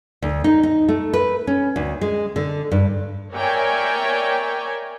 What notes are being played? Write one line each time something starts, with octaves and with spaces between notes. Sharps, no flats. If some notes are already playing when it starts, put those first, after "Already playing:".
D2
D#4
D#4
A3
B4
C#4
D2
G#3
D3
G2
A#4 C#5 D5 E5 G5 G#5